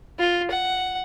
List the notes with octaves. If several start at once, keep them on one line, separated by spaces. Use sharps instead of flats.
F4
F#5